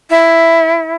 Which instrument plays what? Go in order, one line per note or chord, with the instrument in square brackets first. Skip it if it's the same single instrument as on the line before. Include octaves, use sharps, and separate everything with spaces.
[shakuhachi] E4